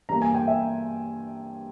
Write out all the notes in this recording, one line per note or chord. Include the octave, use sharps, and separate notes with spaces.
G2 E3 G3 A#3 A#5
G#5
G5
E5